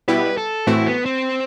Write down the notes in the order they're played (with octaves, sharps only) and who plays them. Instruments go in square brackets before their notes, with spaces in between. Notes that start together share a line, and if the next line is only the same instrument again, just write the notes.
[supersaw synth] B2 G3 B3 E4 G4 [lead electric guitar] B4
[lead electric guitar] A4
[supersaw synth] A2 E3 A3 C4 F#4 [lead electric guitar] E4
[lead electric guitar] B3
C4